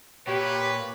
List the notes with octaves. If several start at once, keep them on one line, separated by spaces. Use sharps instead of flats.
A#2 G4 B4 C#5